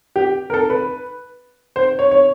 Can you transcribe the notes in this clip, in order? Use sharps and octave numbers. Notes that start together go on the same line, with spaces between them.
G4
A#4
A4
B4
C5
C#5
C#5